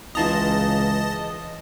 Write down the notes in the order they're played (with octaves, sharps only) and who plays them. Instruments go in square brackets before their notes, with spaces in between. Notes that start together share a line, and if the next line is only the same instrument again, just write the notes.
[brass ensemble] C#2 [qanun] E3 F4 A#5 [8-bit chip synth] D#5 A5